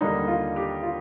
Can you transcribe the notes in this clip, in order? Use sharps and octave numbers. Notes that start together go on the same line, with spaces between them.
D#2 D3 G3 A#3 D4 D#4
F4
G4
F4